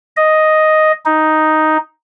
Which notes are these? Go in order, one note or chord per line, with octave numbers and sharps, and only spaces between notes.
D#5
D#4